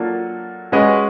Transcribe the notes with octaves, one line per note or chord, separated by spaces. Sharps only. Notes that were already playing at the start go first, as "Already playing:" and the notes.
Already playing: F#3 A#3 D4 F4 A4
G#3 C#4 F#4 B4 D#5